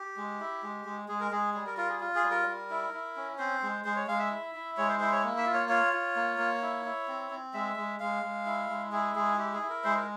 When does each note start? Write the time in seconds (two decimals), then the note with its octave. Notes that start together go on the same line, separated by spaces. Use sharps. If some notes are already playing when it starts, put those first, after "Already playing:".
Already playing: G4
0.17 G#3
0.40 E4
0.63 G#3
0.85 G#3
1.08 G#3 G#4
1.21 A#4
1.31 G#3 G#4
1.54 G3 G#4
1.67 A#4
1.77 F4 A#4
1.89 G#4
2.01 F4
2.15 G#4
2.23 G3
2.31 A#4
2.46 G3
2.70 E4
2.93 E4
3.17 C#4
3.38 C4 C5
3.62 G#3
3.85 G#3 C5
3.96 C#5
4.08 G#3 F5
4.19 E5
4.31 E4
4.55 E4
4.77 G#3 C#5
4.89 C5
5.00 E4 C5
5.12 C#5
5.24 A#3
5.38 E5
5.47 F4
5.54 C#5
5.69 F4 C#5
5.93 F4
6.16 A#3
6.38 A#3
6.62 E4
6.85 E4
7.08 C4
7.31 C4
7.54 G#3 E5
7.76 G#3
8.00 G#3 F5
8.23 G#3
8.46 E4
8.69 G#3
8.92 E4 G#4
9.16 G#3 G#4
9.38 E4 G4
9.54 G#4
9.62 E4
9.69 A#4
9.84 G#3 C5
9.96 A#4